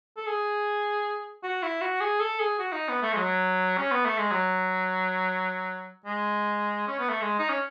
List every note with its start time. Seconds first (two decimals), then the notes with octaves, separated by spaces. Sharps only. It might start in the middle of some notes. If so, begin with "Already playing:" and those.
0.17 A4
0.27 G#4
1.43 F#4
1.63 E4
1.82 F#4
2.01 G#4
2.20 A4
2.40 G#4
2.59 F#4
2.73 D#4
2.88 B3
3.02 A3
3.13 G#3
3.16 F#3
3.78 C#4
3.91 B3
4.05 A3
4.18 G#3
4.32 F#3
6.06 G#3
6.88 C#4
6.99 B3
7.10 A3
7.22 G#3
7.39 D#4
7.49 C#4